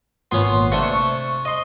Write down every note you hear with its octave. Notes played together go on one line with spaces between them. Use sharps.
G#1 A#2 B3 C#4 C6
C3 A3 D4 C#6
D#5 C6